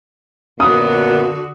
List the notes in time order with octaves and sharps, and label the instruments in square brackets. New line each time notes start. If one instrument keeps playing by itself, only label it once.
[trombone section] F#2 B3 [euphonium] A#2 [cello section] D3 F#4 [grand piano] D#6